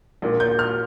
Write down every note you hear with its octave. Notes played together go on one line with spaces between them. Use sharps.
A#1 A#2 A#3
G6
F6